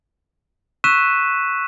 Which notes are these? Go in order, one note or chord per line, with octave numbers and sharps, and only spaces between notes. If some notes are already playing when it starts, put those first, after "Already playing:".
C#6 E6 F#6 B6 D#7 E7